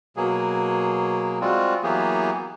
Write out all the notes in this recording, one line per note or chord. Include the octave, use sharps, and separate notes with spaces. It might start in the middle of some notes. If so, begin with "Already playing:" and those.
B2 F#3 A#3 G#4
G3 G#3 C4 F4 F#4
E3 F#3 A#3 B3 G4 G#4